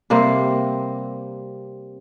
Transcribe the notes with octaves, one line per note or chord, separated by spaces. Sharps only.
C3 G3 A#3 C4